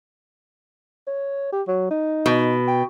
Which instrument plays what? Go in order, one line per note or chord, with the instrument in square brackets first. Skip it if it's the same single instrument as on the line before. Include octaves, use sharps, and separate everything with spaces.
[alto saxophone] C#5
G4
F#3
D#4
[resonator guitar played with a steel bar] B2
[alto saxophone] G5